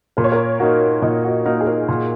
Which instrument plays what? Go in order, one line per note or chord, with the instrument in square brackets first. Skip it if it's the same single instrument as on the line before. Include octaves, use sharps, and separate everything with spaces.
[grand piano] A#2 [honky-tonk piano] A#4
[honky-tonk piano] C#5
A#4
[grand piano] A#3 D#4 A#4 [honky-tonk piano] F#4
[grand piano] A#2 [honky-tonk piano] D#4
[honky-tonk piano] F#4
[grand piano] A#3 D#4 A#4 [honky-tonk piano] F#4
[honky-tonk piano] G#4
A#4
[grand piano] A#2